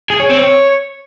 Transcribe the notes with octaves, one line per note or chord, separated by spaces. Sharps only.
G#4
C#5
C4
C#5